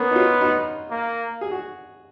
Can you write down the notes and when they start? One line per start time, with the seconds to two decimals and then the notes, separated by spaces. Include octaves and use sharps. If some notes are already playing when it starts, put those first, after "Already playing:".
Already playing: A#3 B3 C#4
0.11 D#4
0.16 C#4 F4
0.41 D#4 F#4
0.91 A#3
1.41 G#4
1.51 F#4